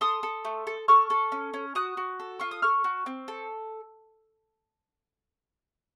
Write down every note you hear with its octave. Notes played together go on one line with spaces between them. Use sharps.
A4 C6 D#6
A4
A3
A4
A4 C#6 F6
A4
C#4
C#4
F#4 D#6 F#6
F#4
A4
F4 C#6
D#6
A4 C#6 F6
F#4
C4
A4